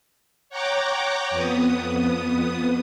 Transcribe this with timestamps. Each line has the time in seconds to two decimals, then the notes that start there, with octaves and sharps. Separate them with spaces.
0.49 C#5 F#5 G5 A#5 D6
1.30 F2 B3 D#6